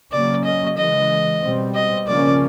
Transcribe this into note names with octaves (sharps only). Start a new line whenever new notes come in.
C#3 F#3 A#3 C#4 D5
D#5
C#3 E3 G#3 D#5
B2 G3 C4
D#5
C#3 F3 A#3 C#4 D5